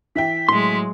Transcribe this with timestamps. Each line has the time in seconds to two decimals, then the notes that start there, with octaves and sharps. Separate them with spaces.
0.16 E3 E5 G5 B6
0.49 A2 F#3 G#3 C6